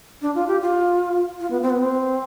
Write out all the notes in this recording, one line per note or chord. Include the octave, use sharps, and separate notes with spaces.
D4
F4
G4
F4
F4
B3
C4
B3
C4